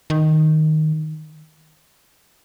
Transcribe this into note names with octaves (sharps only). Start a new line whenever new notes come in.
D#3